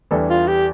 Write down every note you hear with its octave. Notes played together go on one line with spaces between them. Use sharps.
E2 E3 G3 D4 A4
F4
G4